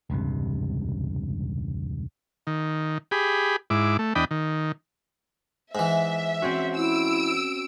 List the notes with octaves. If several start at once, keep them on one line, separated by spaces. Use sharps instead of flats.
E1 C#2 G2 C3
D#3
G4 G#4 B5
G#2 E4 D6
A3
E2 D4 D#5 G5 B5
D#3
G#2 E3 E5
C4 C#4 F#4
E4 E6 D7